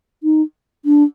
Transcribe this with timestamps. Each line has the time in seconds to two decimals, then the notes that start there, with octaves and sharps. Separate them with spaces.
0.23 D#4
0.85 D4